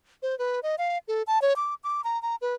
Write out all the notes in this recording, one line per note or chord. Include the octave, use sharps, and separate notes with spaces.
C5
B4
D#5
F5
A4
A5
C#5
D6
D6
A#5
A#5
B4